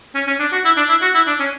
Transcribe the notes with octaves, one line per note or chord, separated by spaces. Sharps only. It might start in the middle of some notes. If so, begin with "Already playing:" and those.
C#4
C#4
D4
F#4
E4
D4
E4
F#4
E4
D4
C#4